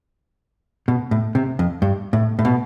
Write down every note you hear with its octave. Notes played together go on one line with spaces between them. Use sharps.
B2
A2
C3
F2
G2
A2
A2
B2